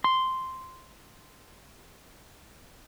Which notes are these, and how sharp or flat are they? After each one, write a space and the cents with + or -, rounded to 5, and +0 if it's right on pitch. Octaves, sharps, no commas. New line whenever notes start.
C6 -5